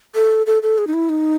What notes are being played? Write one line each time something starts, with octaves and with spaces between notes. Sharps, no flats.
A4
A4
A4
G#4
D#4
E4
D#4